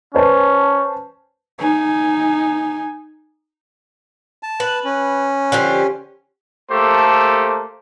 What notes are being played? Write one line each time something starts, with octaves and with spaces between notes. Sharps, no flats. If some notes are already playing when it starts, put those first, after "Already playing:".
C#4 B4 C5 A5
D#4 G#5
A5
B4
C#4
D3 F3 G4
A3 A#3 G4 A4 C5